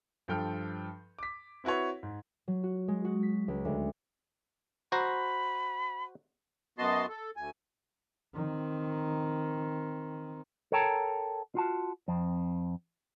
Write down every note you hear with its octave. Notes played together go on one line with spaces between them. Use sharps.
G2 F3 A4 G5 F6 G6
D6 B6
C4 E4 F#4 B4 C#5
G#2
F#3
F#4
G#3
F#4
B6
C#2
D2
F#4 C5 A#5 B5
F#2 B3 F#4 D#5 A5 C6
A4
D2 G#5
D#3 C4
A4 A#4 C#5 G5 A5 A#5
F4 F#4 A5
F2 C4